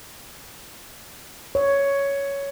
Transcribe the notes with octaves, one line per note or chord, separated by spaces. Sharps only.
C#5